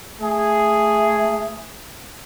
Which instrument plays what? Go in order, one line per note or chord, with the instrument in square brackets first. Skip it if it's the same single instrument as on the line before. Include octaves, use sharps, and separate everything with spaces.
[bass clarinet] A3 [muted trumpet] G#4